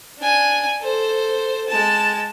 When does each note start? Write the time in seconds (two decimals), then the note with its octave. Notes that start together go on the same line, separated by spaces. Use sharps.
0.18 D4 G#5
0.79 A4 C5
1.68 G#3 A5